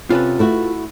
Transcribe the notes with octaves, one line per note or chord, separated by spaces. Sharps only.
C3 B3 C#4 F4 A4 B4
A3 E4 F#4